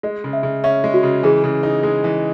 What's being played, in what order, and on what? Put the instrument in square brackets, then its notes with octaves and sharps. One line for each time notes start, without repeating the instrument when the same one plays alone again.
[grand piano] G#3 [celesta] D#5
[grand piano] C#3
[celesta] E5
[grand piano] C#3
[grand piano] C#4 [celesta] E5
[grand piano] G#3
[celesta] F#4
[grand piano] C#3
[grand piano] E3 [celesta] G#4
[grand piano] C#3
D#4
G#3
E3